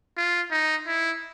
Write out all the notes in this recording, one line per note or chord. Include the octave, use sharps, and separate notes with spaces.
F4
D#4
E4